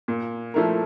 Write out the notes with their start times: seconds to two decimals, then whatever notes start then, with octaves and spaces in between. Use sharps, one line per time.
0.08 A#2
0.54 F3 A3 E4 A#4